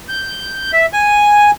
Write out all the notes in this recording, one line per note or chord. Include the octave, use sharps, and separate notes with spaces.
G6
E5
G#5